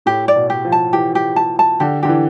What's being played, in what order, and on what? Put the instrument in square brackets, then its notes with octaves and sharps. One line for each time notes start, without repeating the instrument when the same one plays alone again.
[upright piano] A2 [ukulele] G4
[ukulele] D5
[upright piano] B2
[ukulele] G4
[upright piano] F3
[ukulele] A5
[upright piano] E3 [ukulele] G4
[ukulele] G4
A5
A5
[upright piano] D3 [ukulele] G4
[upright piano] D3 [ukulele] G4
[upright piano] E3